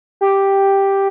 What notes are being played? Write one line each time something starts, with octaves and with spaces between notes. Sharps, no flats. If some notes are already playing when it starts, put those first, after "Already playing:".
G4